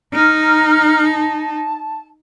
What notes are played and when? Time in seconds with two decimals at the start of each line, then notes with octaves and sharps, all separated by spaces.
0.13 D#4 A#5 F6
1.02 A5